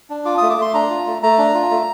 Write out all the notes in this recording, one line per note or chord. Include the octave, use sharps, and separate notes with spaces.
D4
F4 D6
A3 D#6
D6
A3 C6
D4 A#5
F4
A3
A3 A#5
D4
F4
A3